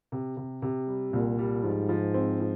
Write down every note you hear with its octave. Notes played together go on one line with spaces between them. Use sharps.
C3
C3
C3
G3
C2 A#2
G3
G#2 F3
F3
C4
F3